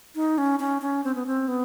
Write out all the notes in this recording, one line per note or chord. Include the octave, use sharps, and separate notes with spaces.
D#4
C#4
C#4
C#4
C4
B3
C4
B3